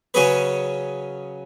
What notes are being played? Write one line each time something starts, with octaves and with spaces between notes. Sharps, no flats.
C#3 F#3 C#4 G#4 B4